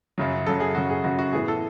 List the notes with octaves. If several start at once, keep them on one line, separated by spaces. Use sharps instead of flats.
F#2 C#3 F#3
F#2 C#3 F#3 A4
G#4
F#2 C#3 F#3 F#4
G#4
F#2 C#3 F#3 F#4
F#4
A2 E3 B3 G#4
A4